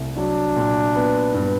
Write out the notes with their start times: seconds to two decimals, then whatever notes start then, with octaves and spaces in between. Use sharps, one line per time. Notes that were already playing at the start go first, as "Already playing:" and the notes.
Already playing: C2 A3
0.16 F#3 D4
0.56 A#2
0.96 B3
1.34 G2